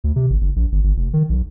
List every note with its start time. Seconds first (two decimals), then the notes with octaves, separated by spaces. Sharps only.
0.04 D2
0.16 C3
0.30 G#1
0.41 F#1
0.56 A#1
0.72 G1
0.84 G1
0.97 F1
1.13 D#3
1.29 B1